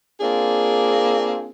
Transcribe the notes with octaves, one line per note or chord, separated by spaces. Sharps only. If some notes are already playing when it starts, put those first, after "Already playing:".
A#3 C4 D4 F4 G#4